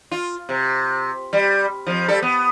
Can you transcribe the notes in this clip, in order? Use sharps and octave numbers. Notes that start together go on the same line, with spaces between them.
F4
C3
G3
F2 F3
G3 A4
B3